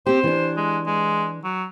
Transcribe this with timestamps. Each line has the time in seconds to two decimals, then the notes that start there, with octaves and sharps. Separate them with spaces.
0.06 C4 G4 C5
0.24 E3 D4
0.57 G#3
0.87 G#3
1.44 F#3